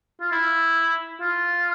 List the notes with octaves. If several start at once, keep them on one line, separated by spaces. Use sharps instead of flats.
F4
E4
F4